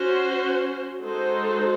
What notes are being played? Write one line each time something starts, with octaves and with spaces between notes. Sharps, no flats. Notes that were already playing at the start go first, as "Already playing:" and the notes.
Already playing: C#4 F#4 C5
G#3 D#4 F#4 A4 C5